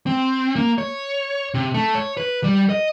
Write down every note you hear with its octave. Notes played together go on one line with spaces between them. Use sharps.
C4
A#3
C#5
C3
A3
C#5
B4
G3
D#5